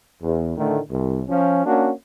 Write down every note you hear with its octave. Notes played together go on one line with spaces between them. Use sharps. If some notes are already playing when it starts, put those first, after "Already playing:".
E2
A2 D3 D#3 A3
C2
F3 C#4
A#3 C#4 D4 F#4